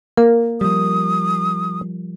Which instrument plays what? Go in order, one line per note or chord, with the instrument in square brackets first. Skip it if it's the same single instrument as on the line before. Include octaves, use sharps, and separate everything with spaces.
[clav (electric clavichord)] A#3 [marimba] A#4
[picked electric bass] F3 G3 [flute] D#6